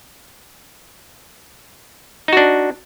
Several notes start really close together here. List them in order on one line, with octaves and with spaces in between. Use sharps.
D#4 F#4 D4